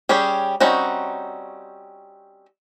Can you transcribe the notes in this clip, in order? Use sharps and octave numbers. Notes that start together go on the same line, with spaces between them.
G3 C#4 G4 G#4
G3 C4 C#4 D#4 F#4